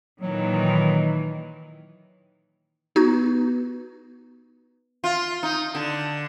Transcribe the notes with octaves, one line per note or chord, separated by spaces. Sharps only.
A#2 D#3 E3 F#3
B3 D#4 F#4 G#6
F4
D#4
D3